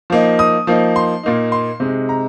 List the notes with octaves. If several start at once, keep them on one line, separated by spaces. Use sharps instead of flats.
F3 A#3 D#4
D#6
F3 A#3 D#4
C6
A#2 A#3 D#4
C6
C3 G#3 D#4
A#5